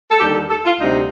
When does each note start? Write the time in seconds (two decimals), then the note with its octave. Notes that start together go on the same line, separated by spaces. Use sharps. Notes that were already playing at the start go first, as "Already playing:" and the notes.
0.11 A4
0.20 D#2 D3 G3 G4
0.35 A4
0.50 A4
0.65 F4
0.80 D2 C3 G3 D#4